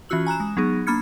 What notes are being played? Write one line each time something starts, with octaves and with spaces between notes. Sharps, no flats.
E3 C#4 F4 F#4 E6 F#7
G#5 A#5 F#6 E7
G#3
F#3 B3 D#4 G#4
A#3 D4 B5 F6 G#6 C#7